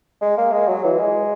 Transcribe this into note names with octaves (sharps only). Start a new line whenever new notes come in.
G#3
A#3
G#3
F#3
E3
G#3